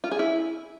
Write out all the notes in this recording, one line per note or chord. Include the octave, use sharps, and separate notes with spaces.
F4
G#4
E4